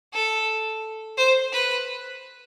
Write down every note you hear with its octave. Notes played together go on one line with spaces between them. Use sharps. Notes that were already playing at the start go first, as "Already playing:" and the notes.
A4
C5
B4